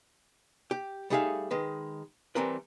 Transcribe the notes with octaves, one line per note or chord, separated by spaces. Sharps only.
G4
G3 A3 D#4 G#4 E5 F5
D#3 G#3 B4
E3 G3 C4 A#4 B4